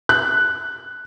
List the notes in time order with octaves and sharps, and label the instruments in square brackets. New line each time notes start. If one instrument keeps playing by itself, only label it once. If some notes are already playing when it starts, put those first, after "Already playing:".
[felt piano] F#6